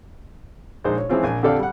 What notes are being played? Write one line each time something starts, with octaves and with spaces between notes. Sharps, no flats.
A#1 G#3 D#4 C5
C#5
E3 F3 G#3 C4 C#4 F4
A#1 G#5
F2 D3 G4 A4 D5 F5
G3 F#5